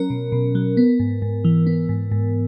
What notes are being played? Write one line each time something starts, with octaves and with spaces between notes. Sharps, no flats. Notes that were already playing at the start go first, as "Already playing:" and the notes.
Already playing: F#3 C#4 A#4
B2
B2
F#3
B3
G#2
G#2
E3
B3
G#2
G#2